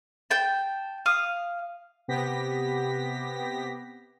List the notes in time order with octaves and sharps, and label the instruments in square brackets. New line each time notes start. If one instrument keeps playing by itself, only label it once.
[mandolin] G5 A5
F5 D#6
[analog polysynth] C3 B3 G4 A#6 B6